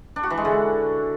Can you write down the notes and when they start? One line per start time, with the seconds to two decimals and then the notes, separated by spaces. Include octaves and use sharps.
0.16 D4
0.23 F#4
0.30 E3
0.38 G#3
0.45 D3